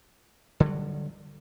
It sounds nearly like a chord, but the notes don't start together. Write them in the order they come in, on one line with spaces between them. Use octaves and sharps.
D3 G3 F#3